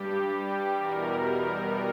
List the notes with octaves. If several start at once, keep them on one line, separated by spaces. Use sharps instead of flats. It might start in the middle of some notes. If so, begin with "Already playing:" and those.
Already playing: G2 G3 G4
G4
E2 B2 G3 A#4